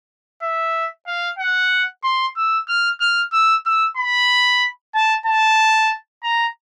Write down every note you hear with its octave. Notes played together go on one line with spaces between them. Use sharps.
E5
F5
F#5
C6
E6
F6
F6
E6
E6
B5
A5
A5
A#5